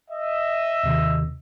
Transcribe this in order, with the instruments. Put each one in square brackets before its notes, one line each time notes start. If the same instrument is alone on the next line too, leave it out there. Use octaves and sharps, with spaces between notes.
[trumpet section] D#5 E5
[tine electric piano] D#2 C3 D#3